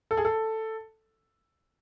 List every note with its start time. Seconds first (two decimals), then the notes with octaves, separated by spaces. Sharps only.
0.11 A4
0.17 G#4
0.25 A4